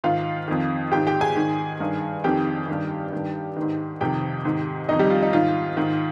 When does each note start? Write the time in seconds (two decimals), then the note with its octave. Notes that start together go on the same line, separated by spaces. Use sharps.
0.04 G#2 D#3 F4 F5
0.48 F2 D#3
0.91 G#2 D#3 G4 G5
1.07 G4 G5
1.21 G#4 G#5
1.36 G#2 D#3
1.80 G2 D#3
2.24 F2 D#3 G4 G5
2.68 G2 D#3
3.13 G2 D#3
3.56 G#2 D#3
4.01 F2 C3 D#3 G4 G5
4.45 G#2 D#3
4.89 F2 D#3 D#4 D#5
4.99 G3 G4
5.10 F4
5.23 D#4
5.33 G#2 D#3 F4
5.77 G#2 D#3